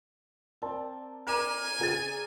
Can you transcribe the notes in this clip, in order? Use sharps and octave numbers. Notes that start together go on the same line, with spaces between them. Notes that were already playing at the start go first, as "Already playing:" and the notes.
C4 A#4 D5 A5
A#4 D5 G#5 A#5 G#6 D7 E7
C#3 G#4 A6